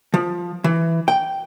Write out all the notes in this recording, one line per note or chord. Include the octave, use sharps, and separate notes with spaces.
F3
E3
G5